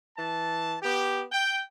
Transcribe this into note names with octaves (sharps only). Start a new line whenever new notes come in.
E3 A5
B3 G4
G5